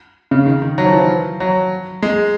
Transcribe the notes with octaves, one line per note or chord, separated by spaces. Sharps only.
C#3
D#3
D#3
F#3
F3
E3
F3
F#3
G#3